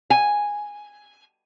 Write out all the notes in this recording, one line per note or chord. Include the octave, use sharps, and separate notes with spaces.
G#5